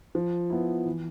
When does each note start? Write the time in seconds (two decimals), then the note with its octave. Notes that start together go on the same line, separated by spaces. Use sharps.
0.15 F3
0.50 B3 E4
0.86 E3